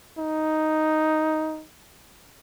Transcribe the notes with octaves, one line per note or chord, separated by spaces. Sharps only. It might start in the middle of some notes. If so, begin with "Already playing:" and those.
D#4